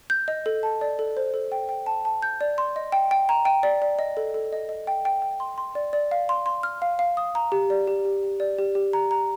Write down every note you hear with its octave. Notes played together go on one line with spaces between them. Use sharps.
G6
D#5
A4
A5
D5
A4
C5
A4
G5
G5
A5
A5
G6
D5
C6
D#5
G5
G5
A#5
G5
D5
D5
D#5
A4
A4
D#5
D#5
G5
G5
G5
C6
C6
D5
D5
F5
C6
C6
F6
F5
F5
D#6
A#5
G4
D5
G4
G4
G4
D5
G4
G4
A#5
A#5